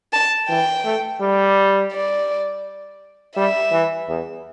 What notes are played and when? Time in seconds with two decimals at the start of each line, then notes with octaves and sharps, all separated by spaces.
0.13 A5
0.49 E3 G5
0.85 A3
1.21 G3
1.93 D5
3.36 G3 E5
3.72 E3
4.08 E2